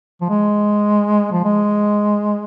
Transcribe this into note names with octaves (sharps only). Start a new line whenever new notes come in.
F3
G#3
F3
G#3